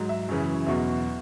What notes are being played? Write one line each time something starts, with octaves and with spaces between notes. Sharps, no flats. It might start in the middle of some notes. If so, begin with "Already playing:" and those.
Already playing: G#2 F#3
E5
F#2 C#3 E3
E2 B2 F#3 E5